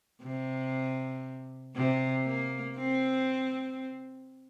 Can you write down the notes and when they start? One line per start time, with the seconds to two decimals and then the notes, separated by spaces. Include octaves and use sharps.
0.23 C3
1.75 C3
2.26 A#3
2.76 C4